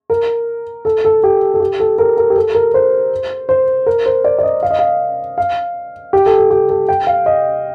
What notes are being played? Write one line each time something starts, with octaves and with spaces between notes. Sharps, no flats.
A#4
A4
A4
G4
A4
G4
A4
A#4
A#4
G4
A4
A#4
C5
C5
A#4
C5
D5
D5
D#5
F5
D#5
F5
F5
G4
A4
A4
G4
A4
G5
F5
D#5